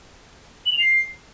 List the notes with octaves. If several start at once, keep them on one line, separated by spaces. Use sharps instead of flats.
F#7
F7
C7